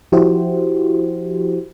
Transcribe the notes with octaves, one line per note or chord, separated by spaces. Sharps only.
F3 E4 F#4 G4 C5